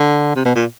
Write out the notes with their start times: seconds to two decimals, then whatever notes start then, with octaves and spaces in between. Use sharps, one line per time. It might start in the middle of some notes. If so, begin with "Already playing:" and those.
Already playing: D3
0.36 C3
0.45 B2
0.55 A#2